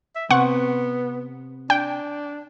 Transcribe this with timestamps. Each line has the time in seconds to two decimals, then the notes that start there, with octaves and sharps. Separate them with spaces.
0.16 E5
0.30 C3 B3 F#5 C#6
1.70 D4 G5